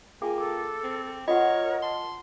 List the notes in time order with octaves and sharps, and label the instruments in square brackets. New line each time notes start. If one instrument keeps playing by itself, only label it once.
[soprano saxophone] A#3 [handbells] F4 G5 [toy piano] G#4 [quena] G#5
[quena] A4 [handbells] D6
[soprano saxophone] C4
[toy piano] F4 F#4 F#5 [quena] A#4 [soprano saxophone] C#5 [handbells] D#5
[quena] A5 [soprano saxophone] C6